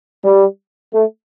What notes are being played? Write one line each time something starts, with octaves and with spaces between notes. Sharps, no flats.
G3
A3